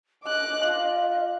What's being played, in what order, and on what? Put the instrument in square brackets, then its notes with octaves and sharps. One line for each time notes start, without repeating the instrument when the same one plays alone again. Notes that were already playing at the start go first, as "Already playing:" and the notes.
[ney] D#5 [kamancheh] D6 F#6
[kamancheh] F4